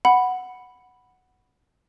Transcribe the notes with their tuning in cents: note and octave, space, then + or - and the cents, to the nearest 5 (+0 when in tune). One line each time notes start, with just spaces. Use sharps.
F#5 +0 B5 +0